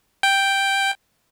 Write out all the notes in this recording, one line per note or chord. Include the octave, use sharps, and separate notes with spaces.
G5